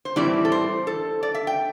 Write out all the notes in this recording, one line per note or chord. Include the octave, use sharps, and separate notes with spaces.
C5
A2 E3 G3 C4 E4 D5
A4
C5
A4
D5
E5
G5